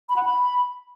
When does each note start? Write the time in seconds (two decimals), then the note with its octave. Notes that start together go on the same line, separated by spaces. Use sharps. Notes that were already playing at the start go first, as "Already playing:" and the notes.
0.09 B5
0.16 F#5
0.23 B5